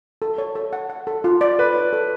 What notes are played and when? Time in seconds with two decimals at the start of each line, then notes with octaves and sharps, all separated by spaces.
0.22 A4
0.38 C#5
0.55 A4
0.73 F#5
0.90 F#5
1.07 A4
1.24 F4
1.41 D5
1.58 A4 B4
1.76 C#5
1.93 A4